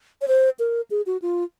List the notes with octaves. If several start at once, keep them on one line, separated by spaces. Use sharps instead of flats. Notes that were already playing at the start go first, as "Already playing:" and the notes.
C#5
C5
A#4
G#4
F#4
F4